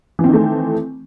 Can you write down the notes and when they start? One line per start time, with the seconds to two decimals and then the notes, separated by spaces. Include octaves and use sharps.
0.19 E3
0.24 C4
0.29 D#3
0.34 A3